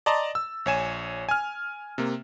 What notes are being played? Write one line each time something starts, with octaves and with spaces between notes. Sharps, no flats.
D5 D#5 A5 A#5 C6 A6
E6
A#1 C#5 G#5 E7
G#5 F6
C3 A#3